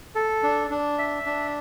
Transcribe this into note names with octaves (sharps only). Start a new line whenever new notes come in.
A4
D4
D4
E5
D4